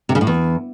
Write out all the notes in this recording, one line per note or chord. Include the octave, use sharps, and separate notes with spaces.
C3
C#3
A2
E2